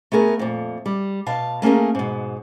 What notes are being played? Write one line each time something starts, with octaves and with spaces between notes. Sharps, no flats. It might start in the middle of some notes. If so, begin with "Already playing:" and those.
A3 B3 G#4 A#4
F2 A#2
G3
B2 F5 A5
A3 A#3 C#4 G#4 A#4
G#2 B2